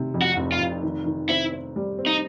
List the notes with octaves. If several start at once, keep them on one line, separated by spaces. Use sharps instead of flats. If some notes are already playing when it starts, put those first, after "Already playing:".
Already playing: C3 D#3
F2
F#4
F1
F4
F1
D#3
D#3
C4 E4
C4
G3
C4
D#4